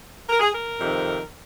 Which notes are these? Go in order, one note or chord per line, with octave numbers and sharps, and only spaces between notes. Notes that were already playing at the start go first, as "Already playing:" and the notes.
A#4
G#4
A#4
F2 C3 D#3